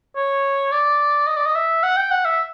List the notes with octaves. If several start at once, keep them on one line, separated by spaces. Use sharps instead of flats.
C#5
D5
D#5
D5
D#5
E5
F#5
G5
F#5
E5